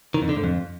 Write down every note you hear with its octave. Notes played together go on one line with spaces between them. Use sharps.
D#3
F2
D3
G#2
F2